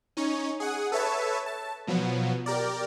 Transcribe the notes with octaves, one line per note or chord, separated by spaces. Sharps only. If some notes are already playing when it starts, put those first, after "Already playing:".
C#4 D#4 C#5
G#4 F#5 D#6
A4 B4 C#5 E5 A5
A5
B2 F3 F#3 B3
G4 A#4 D5